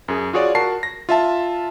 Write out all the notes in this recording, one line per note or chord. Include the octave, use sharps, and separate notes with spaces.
F#2 G#4
F4 F#4 G#4 C#5 D5
F#4 A#4 A5 C7
A#6
F4 E5 A5